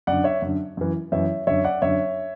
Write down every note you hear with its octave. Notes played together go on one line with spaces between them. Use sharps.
F#2 D3 D5 F#5
C#5 E5
F#2 D3
F#2 E3
F#2 E3 C#5 E5
F#2 D3 C#5 E5
D5 F#5
F#2 D3 C#5 E5